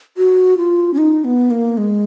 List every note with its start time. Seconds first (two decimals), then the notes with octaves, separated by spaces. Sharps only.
0.17 F#4
0.57 F4
0.94 C#4
0.98 D#4
1.24 B3
1.51 A#3
1.78 G#3